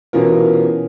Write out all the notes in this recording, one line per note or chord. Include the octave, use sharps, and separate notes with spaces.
B2 E3 C#4 F4 A#4